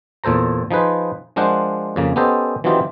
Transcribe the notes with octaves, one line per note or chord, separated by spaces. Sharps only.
E2 A#2 A4 C5 A#5
F3 D#4 G#4 B4 C5
F3 G#3 D4 A#4 C5 F#5
F2 C#3 A#3
B3 C#4 G4 A4 C5 D#5
E3 F#3 C4 D#4 F4 G4